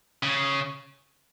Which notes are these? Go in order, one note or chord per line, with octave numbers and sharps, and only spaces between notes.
C#3